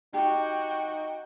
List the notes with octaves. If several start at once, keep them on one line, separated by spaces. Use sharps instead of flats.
D#4 F#4 G4 G5